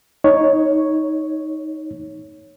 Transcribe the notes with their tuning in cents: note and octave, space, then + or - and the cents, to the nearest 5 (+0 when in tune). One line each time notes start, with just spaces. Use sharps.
D#4 +10 C#5 +0